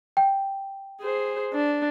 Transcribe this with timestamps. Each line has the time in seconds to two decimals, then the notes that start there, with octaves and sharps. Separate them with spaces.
0.17 G5
1.01 G#4 C5
1.53 D4